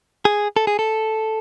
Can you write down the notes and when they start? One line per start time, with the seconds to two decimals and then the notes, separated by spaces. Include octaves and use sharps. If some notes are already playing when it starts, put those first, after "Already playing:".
0.25 G#4
0.56 A4
0.67 G#4
0.79 A4